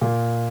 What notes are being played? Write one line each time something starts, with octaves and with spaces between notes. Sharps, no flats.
A#2